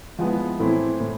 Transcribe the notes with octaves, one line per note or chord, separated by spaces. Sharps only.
F3 G#3 B3 E4
A2 E3 A3 C4 E4
A2